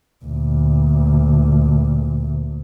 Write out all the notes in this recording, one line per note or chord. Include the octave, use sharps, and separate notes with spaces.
D2 A#2